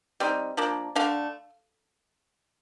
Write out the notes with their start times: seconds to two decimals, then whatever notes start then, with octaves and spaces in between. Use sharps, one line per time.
0.20 G3 C4 D#4
0.57 F3 A#3 D4
0.95 D3 A3 D4 F5